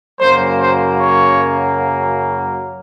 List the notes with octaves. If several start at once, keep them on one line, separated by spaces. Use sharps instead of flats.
F#2 C#3 F#3 A#3 C5
C5
C#5